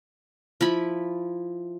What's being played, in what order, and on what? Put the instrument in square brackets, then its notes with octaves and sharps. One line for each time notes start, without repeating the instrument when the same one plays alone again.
[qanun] F3 E4 B5